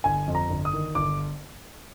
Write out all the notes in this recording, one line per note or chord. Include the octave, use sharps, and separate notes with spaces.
G1 G#5
F2
A#5
G1
D#6
D#3
G1 D6